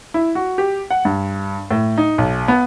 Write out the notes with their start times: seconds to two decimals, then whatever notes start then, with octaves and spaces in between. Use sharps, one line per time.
0.14 E4
0.35 F#4
0.58 G4
0.91 F#5
1.05 G2
1.71 A2
1.98 D#4
2.18 B1
2.48 B3